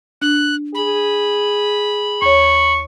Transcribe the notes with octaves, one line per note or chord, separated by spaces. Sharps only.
D4 F#6
G#4 B5
D#2 C#5 C#6